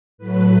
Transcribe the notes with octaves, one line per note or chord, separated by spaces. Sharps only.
A2 F#3 A3 B4